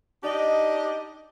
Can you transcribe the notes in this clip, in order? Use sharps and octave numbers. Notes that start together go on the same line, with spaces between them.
D4 D#4 G4 D5 D#5